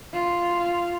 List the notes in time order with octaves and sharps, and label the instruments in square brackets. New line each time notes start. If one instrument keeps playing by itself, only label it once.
[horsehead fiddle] F4